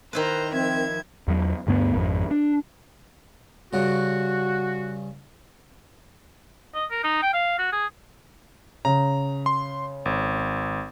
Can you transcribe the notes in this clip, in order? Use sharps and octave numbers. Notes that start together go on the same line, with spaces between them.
D#3 E4 B4 C5 A#5
F3 C4 E5 G#6
E2 F#3
D2 G2 A3 B3
G#1 F2
D4
G2 C#3 F#4
D#5
A#4
D#4
G5
F5
F#4
G#4
C#3 A#5
C6
G#1